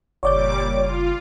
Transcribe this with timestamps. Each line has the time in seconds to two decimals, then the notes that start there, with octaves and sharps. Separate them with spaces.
0.23 F#1 A#2 G3 C#5 D5 D6 G6
0.79 F4